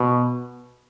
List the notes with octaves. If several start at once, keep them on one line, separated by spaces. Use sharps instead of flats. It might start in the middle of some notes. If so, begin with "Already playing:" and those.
Already playing: B2